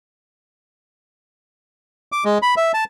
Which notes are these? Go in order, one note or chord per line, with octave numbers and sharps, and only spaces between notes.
D6
G#3
B5
E5
A5